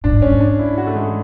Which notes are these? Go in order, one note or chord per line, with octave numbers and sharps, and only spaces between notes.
A2 D4
G#2
F#2 C#4
G#2
D4
E4
F#4
A3
G#3